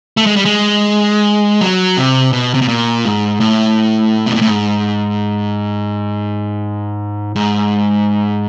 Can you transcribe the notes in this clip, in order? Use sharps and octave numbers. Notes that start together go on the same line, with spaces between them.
A3
G#3
G3
G#3
F#3
C3
B2
C3
B2
A#2
G#2
A2
B2
A#2
A2
G#2
G#2